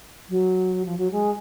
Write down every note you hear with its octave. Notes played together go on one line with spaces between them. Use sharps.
F#3
F3
F#3
G#3